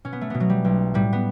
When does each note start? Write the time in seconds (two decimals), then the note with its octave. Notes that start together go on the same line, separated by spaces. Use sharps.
0.05 B2 C#4
0.13 B3
0.21 A3
0.30 B2 B3
0.40 F#3
0.49 G3
0.65 B1
0.94 A2 G3
1.13 B3